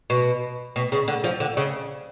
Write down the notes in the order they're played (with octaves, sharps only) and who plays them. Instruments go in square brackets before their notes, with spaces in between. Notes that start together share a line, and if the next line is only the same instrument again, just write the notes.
[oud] B2
B2
C#3
D3
F3
D3
C#3